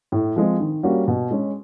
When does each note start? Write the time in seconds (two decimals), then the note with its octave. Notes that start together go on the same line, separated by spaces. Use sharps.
0.12 A2
0.36 F3 G#3 C4
0.60 D#3
0.83 G3 A#3 C#4 F#4
1.08 B2
1.31 G#3 C#4